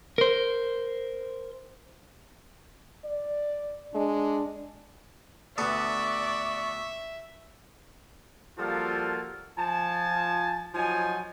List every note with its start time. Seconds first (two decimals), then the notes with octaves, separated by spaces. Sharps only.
0.18 A#4 C5
3.04 D5
3.94 G#3 D4
5.58 D2 B3 A4 D5 E5 C#6
8.58 F3 G3 A#3 F4 F#4 A4
9.58 F3 G#5 A5
10.74 F3 F#3 D#4 G#5